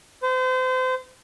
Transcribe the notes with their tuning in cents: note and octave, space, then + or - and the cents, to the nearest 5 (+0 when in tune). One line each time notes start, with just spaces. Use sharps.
C5 -35